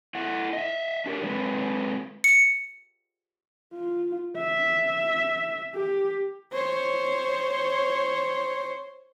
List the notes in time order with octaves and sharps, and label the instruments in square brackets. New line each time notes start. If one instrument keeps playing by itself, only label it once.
[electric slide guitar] A3 E4 F#5
D#5 E5
D4 G4 A4 A#4
F#3 G#3 C4 B4
[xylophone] C#7
[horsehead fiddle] F4
E5
G4
C5 C#5